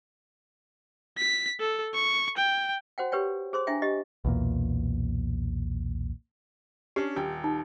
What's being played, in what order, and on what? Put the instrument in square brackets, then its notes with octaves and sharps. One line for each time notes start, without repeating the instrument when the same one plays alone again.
[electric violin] B6
A4
C#6
G5
[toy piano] F#4 C5 F#5 G5
G4 B4 C#5 G5
G#4 C5 C6 D#6
D4 E4 E5 G5 G#5
G4 D#5
[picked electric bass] B1 E2 A#2
[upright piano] C#4 D4 [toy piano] G4
[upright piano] D#1 G5
[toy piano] D#4